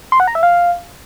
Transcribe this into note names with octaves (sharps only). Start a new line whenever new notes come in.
C6
F#5
A#5
E5
F5